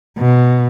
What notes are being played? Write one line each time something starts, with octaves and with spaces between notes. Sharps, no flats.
B2